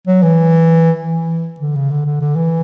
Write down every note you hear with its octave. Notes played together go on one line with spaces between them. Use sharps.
F#3
E3
E3
D3
C#3
D3
D3
D3
E3